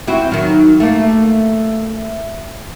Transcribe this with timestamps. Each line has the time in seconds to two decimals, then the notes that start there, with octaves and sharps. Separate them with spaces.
0.07 C4 E4 F#4
0.32 D#3 F#3
0.80 A3 A#3